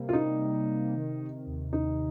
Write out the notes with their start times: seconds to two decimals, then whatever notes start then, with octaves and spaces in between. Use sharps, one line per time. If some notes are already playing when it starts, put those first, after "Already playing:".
Already playing: C3 G3 A#3
0.09 F4
0.13 C3 D#4
0.40 C3
0.67 C3
0.94 D#3
1.20 D#3
1.46 D#2
1.73 D#2 D#4